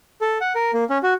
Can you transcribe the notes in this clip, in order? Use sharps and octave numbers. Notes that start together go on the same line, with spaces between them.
A4
F#5
A#4
A#3
C#4
F#4